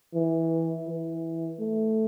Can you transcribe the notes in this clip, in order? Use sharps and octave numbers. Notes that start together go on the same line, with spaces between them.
E3
E3
A3